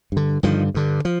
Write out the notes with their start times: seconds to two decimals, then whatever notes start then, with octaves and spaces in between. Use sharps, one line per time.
0.12 G2 D3
0.43 G2 D3 D#3 F3
0.74 G2 D3
1.05 F3